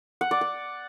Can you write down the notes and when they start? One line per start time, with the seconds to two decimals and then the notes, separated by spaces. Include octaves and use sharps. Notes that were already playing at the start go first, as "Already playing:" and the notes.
0.21 F#5
0.31 D5
0.41 F#5